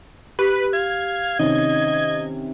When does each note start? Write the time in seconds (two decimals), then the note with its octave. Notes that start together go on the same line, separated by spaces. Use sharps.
0.39 G4 B4
0.73 F5 G#6
1.39 C3 D#3 C#4 D#5